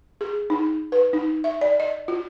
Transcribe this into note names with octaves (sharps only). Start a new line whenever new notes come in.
G#4
D#4
B4
D#4
E5
D5
D#5
F4